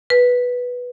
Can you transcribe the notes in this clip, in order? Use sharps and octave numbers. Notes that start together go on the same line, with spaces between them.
B4